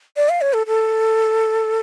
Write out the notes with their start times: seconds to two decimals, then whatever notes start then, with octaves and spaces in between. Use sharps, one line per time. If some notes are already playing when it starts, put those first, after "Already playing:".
0.17 D5
0.29 F5
0.41 C#5
0.53 A4
0.67 A4